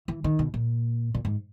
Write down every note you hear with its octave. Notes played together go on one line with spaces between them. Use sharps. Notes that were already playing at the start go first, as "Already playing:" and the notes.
E3
D#3
B2
A#2
A#2
G#2